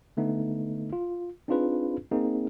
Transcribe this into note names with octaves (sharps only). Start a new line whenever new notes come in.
D3 A3 B3 D#4
F4
C4 D4 D#4 F4 G#4 B4
A#3 C4 D#4 G#4